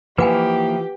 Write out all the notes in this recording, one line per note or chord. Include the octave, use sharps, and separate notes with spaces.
E3 F3 A#3 G4 B4 F#5 G#5